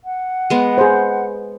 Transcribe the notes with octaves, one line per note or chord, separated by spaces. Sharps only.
F#5
G#3 B3
G#4 C5